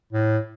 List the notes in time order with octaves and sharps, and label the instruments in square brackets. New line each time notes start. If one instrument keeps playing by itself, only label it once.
[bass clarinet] A2